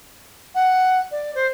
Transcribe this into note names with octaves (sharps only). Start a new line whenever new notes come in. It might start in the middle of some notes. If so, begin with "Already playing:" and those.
F#5
D5
C5